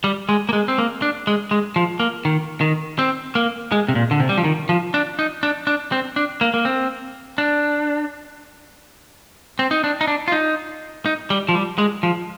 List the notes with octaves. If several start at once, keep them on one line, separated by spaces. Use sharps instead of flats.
G3
G#3
A#3
G#3
C4
A#3
D4
G#3
G#3
F3
A#3
D#3
D#3
C4
A#3
G#3
C3
A#2
D3
C3
G3
F3
D#3
F3
D4
D#4
D4
D4
C4
D4
A#3
A#3
C4
D4
C4
D#4
D4
D#4
D4
F4
D#4
D#4
G3
F3
G3
G#3
F3